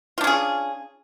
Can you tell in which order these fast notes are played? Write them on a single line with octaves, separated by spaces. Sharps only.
F4 D4 C#4 G#4